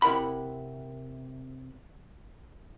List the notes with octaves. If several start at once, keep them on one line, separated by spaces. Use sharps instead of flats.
C3 E4 A#4 F#5 B5